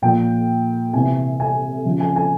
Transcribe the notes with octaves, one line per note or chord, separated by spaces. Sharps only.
A#2 F3 G5
C3 E3 G#5
G#5
C#3 F3
G#5
G#5